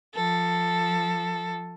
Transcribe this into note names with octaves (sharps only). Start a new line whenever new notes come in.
F3 A4